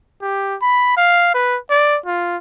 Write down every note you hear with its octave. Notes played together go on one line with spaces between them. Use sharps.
G4
B5
F5
B4
D5
F4